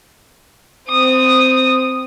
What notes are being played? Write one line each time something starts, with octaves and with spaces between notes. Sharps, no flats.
C4 D#6